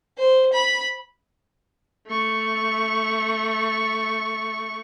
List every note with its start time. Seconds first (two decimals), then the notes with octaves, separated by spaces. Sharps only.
0.18 C5
0.53 B5
2.08 A3 C#6